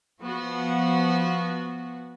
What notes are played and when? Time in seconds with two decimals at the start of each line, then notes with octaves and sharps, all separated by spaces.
0.20 F3 B3 F#4